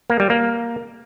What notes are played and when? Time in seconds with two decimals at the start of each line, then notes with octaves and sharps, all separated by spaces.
0.10 A#3
0.20 G3
0.30 A#3